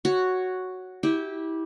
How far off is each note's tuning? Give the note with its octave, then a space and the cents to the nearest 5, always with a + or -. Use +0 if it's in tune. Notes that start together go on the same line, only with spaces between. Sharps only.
F#4 +0 C#5 +0
E4 -25 G4 +0